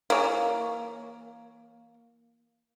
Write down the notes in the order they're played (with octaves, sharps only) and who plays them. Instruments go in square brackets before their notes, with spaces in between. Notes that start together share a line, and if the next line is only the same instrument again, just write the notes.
[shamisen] E3 C#5 G#5 [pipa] A#3